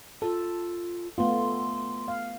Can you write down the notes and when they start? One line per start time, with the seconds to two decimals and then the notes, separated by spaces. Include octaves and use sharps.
0.22 F4 A4
1.18 A3 B3 F4 C6
2.08 F5